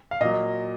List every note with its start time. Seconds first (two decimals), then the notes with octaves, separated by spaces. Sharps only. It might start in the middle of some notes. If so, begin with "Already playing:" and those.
0.11 F5
0.21 A#2 F#3 D#5